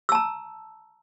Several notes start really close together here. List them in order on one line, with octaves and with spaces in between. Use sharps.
E6 A5 A#5